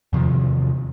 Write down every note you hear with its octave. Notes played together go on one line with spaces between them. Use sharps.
E2 C3 D#3 F3